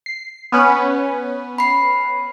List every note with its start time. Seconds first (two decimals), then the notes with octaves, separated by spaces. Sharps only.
0.06 C7
0.52 B3 C#4 B4
1.58 B5 C7